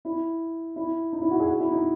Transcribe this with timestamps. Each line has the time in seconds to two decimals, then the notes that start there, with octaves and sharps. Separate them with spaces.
0.05 E4
0.76 E4
1.13 D#4
1.21 E4
1.31 F#4
1.40 G#4
1.48 F#4
1.60 E4
1.72 D#4